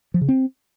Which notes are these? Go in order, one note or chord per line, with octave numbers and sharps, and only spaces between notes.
F3
C#3
C4